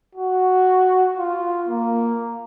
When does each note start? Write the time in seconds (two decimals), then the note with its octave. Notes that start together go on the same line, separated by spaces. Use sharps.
0.15 F#4
1.17 F4
1.69 A#3